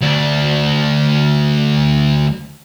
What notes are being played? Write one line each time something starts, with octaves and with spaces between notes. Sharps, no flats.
D2 D4